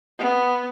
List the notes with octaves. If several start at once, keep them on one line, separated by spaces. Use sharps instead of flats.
B3